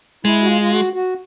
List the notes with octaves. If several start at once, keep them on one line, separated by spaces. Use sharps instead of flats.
G#3 E4
F#4
F4
F4
F#4
F#4